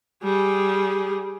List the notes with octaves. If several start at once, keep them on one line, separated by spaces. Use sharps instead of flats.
G3 G#4